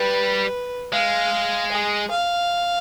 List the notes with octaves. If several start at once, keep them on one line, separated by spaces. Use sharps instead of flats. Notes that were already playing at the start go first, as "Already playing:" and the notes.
Already playing: G3 B4
G#3 F5
G#4
F5